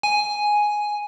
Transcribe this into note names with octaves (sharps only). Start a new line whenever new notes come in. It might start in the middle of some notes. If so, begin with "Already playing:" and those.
G#5